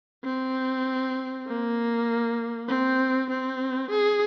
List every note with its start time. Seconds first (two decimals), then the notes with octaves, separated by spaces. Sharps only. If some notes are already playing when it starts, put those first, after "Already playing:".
0.24 C4
1.47 A#3
2.68 C4
3.30 C4
3.91 G#4